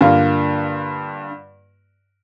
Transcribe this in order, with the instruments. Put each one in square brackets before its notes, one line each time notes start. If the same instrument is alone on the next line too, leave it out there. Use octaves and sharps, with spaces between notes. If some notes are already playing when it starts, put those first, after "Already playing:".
[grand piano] G2 D3 A#3 F4